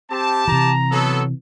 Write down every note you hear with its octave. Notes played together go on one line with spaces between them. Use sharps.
C4 G4 A5
C3 E3 A#5
F#3 B3 A4